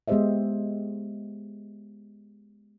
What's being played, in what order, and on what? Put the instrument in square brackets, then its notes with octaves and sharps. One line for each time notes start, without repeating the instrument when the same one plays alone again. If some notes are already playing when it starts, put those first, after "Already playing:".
[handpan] G#3 B3 G4 C5 D#5 E5